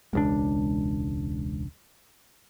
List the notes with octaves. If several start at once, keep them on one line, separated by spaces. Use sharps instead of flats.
E1 C#2 G#3 D4